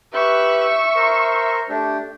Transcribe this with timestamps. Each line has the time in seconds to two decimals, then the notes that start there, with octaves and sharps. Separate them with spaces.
0.14 G4 B4 E5 C#6 F#6
0.96 A#4 C5
1.69 A3 D4 G4